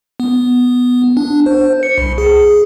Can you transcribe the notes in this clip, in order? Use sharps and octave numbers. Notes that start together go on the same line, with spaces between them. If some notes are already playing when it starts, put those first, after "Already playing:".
B3
D4
C5
C#7
C2
G#4